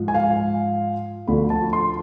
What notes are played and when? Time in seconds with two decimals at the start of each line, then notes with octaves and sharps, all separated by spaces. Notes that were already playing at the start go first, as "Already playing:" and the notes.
Already playing: G#2 F3
0.08 G#5
0.14 F5
1.27 D2 D3 F3 B5
1.50 A5
1.73 C6